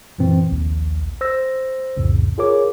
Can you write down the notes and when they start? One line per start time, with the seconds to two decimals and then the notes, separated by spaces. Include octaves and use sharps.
0.18 F#2 A#2 E3 C4
0.52 A#1 D#2
1.21 C5 E6 A#6
1.97 C2 F2 A2 C#3
2.38 F4 G#4 A#4 C#5 D6